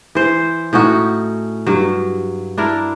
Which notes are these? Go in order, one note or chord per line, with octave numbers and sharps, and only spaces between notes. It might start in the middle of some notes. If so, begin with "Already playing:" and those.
E3 C5
A2 C#4 D#4 F#4
G2 F#3
D4 E4 A#4